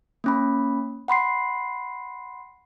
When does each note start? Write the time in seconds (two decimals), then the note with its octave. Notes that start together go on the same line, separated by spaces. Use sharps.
0.24 A#3 C#4 B5
1.08 F#5 B5 C6 C7